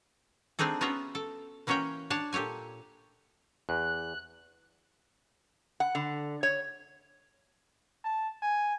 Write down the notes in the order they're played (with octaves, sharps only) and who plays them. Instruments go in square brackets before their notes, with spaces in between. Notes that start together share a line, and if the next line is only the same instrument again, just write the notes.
[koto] A3 C4 D4 D#4 G#4 A4
B3 C#4 F4 F#4 E5 A#5
A4
E3 A#3 C#4 F#4 C#5 G5
D4 C#5 A5
A#2 G4 A4 C#5 G#5
[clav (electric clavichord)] E2 [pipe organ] F#6
[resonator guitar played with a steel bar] F#5
D3
C#5
[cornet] A5
G#5